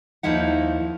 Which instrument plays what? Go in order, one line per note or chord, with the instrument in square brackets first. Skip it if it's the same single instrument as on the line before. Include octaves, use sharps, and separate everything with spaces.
[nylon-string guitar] D#2 F3 D#4 E4 F#5